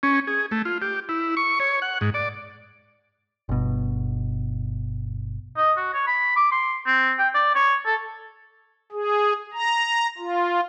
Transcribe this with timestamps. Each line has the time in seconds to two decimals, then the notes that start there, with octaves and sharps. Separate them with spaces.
0.03 C#4
0.27 G#4
0.51 A3
0.65 F4
0.82 G4
1.09 E4
1.37 C#6
1.60 C#5
1.82 F#5
2.01 G#2
2.14 D5
3.49 G1 B2
5.57 D#5
5.77 F#4
5.94 C#5
6.07 B5
6.36 D6
6.52 C6
6.86 C4
7.18 G5
7.34 D5
7.55 C#5
7.86 A4
8.92 G#4
9.54 A#5
10.18 F4